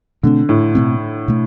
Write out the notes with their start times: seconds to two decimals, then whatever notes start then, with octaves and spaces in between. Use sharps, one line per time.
0.23 B2 D3 A3 C4
0.49 A2
0.75 B2 A3 C4
1.28 B2 A3